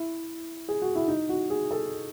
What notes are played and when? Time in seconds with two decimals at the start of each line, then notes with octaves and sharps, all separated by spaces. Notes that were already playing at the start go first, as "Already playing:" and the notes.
Already playing: E4
0.69 G#4
0.82 F#4
0.95 E4
1.08 D#4
1.29 F#4
1.50 G#4
1.71 A4